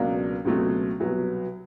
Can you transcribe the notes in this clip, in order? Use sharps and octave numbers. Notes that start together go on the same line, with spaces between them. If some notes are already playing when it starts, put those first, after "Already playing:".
Already playing: C#2 B2 F#3 A#3 D4
C#2 B2 F#3 A3 C4
C2 B2 F#3 B3